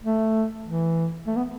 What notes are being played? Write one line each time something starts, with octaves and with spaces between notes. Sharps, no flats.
A3
E3
A3
B3